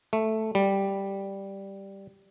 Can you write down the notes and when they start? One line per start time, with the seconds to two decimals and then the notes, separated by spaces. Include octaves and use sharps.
0.13 A3
0.55 G3